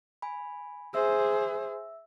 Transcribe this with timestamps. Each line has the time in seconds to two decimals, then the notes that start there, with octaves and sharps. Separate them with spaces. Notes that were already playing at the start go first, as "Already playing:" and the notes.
0.22 G#5 B5
0.94 G#4 C5 E5 E6